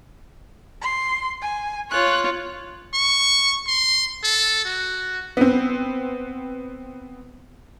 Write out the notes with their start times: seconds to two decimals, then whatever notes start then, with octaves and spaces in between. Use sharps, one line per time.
0.82 C6
1.42 G#5
1.91 F4 C#5 F#6
2.94 C#6
3.67 C6
4.24 A4
4.65 F#4
5.37 B3 C4